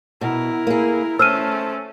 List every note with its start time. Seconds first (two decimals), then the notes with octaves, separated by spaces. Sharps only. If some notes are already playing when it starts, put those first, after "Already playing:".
0.21 B2 E4 A#4
0.67 A#3 G#4
1.19 A3 C#4 C5 E6 F6 D#7